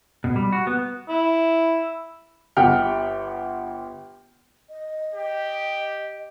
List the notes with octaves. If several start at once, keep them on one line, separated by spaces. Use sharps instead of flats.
B2
G3
F#4
B3
E4
G1 G4 F#5 G5 F6
D#5
G4